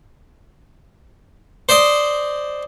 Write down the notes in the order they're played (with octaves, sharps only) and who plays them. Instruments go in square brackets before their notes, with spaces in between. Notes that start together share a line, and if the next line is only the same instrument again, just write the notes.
[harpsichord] C5 D5 D#5